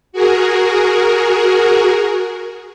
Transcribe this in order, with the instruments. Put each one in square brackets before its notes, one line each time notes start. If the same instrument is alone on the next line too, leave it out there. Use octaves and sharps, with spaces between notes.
[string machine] F#4 G#4 A#4